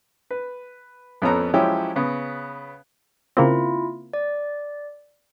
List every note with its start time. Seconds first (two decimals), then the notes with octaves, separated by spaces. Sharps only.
0.31 B4
1.22 F2 F3 B3 C#4 A4 A#5
1.54 F3 F#3 G#3 C#4 E4 G4
1.96 C#3 B3
3.37 C#3 A#3 C4 E4 F4
4.13 D5